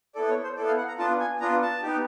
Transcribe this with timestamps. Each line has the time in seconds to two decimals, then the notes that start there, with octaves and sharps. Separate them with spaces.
0.15 B3 E4 A4 D5
0.29 C#5
0.43 C5
0.57 B3 E4 A4 D5
0.67 F5
0.78 F#5
0.88 A#5
0.98 B3 D4 F4 A5
1.20 G#5
1.40 B3 D4 F4 A#5
1.62 A5
1.82 B3 D#4 G4